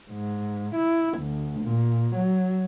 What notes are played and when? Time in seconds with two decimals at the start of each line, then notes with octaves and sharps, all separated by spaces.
0.10 G#2
0.76 E4
1.19 D2
1.62 A#2
2.16 F#3